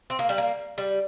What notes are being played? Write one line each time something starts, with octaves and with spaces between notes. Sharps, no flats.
C4
A#3
G3
A#3
G3